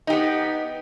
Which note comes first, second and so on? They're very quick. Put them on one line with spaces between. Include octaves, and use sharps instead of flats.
D#4 G4 B3